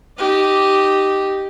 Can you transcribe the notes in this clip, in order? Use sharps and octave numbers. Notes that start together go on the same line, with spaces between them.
D#4 G4